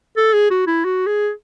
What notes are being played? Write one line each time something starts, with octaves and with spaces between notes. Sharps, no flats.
A4
G#4
F#4
E4
F#4
G#4